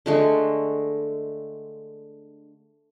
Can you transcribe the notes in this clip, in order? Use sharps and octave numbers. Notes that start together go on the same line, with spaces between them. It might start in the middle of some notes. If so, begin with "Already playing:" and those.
D3 G#3 A3